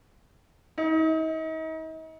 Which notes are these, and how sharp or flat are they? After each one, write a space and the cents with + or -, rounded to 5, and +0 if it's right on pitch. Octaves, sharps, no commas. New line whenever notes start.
D#4 +40